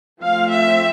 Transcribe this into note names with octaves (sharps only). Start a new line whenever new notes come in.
F3 A3 C4 F5
E5